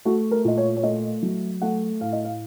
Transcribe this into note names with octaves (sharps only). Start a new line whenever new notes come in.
A3 F#4
A#4
A#2 D#5
C#5
C#5
A3 D#5
F#3
A3 F#5
A2 F5
D#5
F5